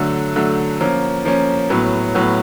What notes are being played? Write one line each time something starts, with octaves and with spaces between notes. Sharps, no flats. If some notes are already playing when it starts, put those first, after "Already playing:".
Already playing: D3 F#3 A3
D3 F#3 A3
F3 A#3 C#4
F3 A#3 C#4
A2 F#3 B3
A2 F#3 B3